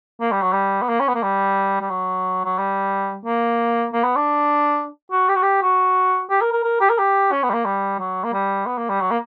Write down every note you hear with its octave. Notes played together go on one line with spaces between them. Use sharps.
A#3
G3
F#3
G3
B3
A#3
C#4
B3
A#3
G3
G3
F#3
F#3
G3
A#3
A#3
B3
D4
F#4
G4
F#4
G4
F#4
G4
A#4
A#4
A#4
G4
A#4
G4
C#4
B3
G3
A#3
G3
F#3
A#3
G3
B3
A#3
G3
F#3
A#3